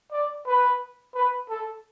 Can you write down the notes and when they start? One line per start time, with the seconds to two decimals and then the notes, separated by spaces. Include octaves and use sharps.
0.12 D5
0.46 B4
1.14 B4
1.50 A4